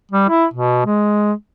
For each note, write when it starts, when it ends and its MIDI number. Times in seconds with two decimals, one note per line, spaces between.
0.11 0.27 55
0.29 0.45 64
0.54 0.85 47
0.86 1.32 56